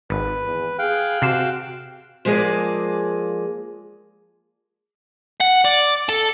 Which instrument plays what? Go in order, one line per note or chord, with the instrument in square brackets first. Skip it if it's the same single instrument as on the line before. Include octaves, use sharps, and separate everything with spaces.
[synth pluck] G#1 [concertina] B4
[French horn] E2
[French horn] G#4 [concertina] F5 G5 F#6
[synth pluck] C3 C7 E7 [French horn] F#4
[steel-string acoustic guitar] F3 G#3 A#3 G#4 D5
[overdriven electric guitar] F#5
D5
A4